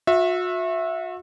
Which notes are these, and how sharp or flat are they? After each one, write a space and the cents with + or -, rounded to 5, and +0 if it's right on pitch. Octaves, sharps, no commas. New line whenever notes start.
F#4 -40 E5 +0